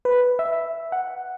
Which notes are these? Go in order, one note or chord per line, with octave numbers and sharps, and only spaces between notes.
B4
E5
F#5